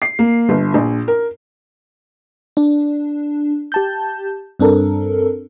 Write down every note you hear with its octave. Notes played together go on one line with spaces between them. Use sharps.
C7
A#3
G1
A#1
A#4
D4
G4 A5 G6
G2 C4 D4 A4 A#4